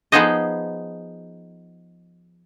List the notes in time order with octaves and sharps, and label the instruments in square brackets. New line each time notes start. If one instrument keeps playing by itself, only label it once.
[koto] F3 B3 D#4 G#4 C5 D#5